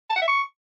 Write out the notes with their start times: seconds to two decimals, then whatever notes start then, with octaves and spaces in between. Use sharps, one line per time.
0.10 A5
0.16 F#5
0.22 E5
0.28 C#6